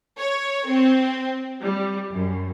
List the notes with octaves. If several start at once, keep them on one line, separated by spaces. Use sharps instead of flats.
C#5
C4
G3
F#2